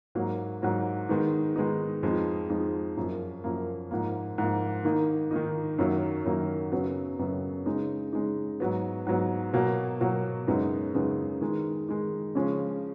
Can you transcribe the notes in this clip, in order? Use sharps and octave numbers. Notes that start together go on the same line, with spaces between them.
G#2 F#3 A#3
G#2 F#3 A#3
D#3 G#3 B3 D#4
D#3 G#3 B3 D#4
F2 F3 G#3 D#4
F2 F3 G#3 D#4
F#2 F3 A#3
F#2 F3 A#3
G#2 F3 A#3
G#2 F3 A#3
D#3 A#3 D#4
D#3 A#3 D#4
F#2 D#3 F#3 A#3
F#2 D#3 F#3 A#3
F#2 C#3 F#3 B3
F#2 C#3 F#3 B3
C#3 G#3 D#4
C#3 G#3 D#4
G#2 F#3 B3
G#2 F#3 B3
B2 F#3 A#3
B2 F#3 A#3
F#2 C#3 G#3 B3 D#4
F#2 C#3 G#3 B3 D#4
D#3 G#3 D#4
D#3 G#3 D#4
C#3 F3 G#3 C#4